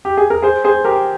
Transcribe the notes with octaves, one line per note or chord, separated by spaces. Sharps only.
G4
G#4
A#4
G#4 C5
G#4 C5
G4 A#4